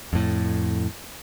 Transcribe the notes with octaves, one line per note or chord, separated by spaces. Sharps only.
F2 A2